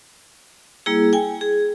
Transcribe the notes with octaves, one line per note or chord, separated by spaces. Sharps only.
G3 A#3 E4 G#4
G5 G#5
G#4